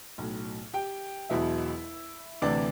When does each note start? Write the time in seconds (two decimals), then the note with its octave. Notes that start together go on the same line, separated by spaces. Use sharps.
0.18 B1 A2 F#3
0.74 G4 G5
1.30 E1 E2 B2 F#3 E4 E5
2.42 D2 C3 E3 D4 D5